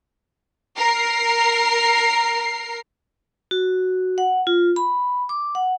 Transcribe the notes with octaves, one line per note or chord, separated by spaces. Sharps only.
A#4 C7
F#4
F#5
F4
B5
D6
F#5